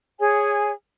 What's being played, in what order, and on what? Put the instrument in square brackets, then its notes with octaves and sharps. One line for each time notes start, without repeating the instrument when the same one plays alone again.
[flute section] G#4 C#5 G#5